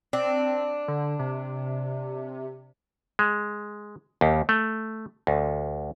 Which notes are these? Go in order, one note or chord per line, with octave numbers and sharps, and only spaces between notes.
C4 D4
D3
C3
G#3
D#2
A3
D2